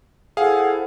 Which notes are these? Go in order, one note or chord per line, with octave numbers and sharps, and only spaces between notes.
E4 G#4 A4 C5 F5 F#5 G#5